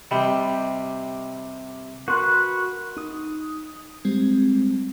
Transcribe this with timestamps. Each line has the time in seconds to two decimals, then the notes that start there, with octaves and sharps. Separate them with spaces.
0.11 C3 G3 D#5 G5 B5
2.08 F#4 A#4 B4 C6
2.97 D#4 D#6
4.05 G3 G#3 C4